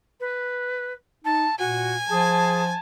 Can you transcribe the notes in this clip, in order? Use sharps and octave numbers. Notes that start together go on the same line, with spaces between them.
B4
D#4 A5
A#2 F#4 G#5
F3 G#4 A5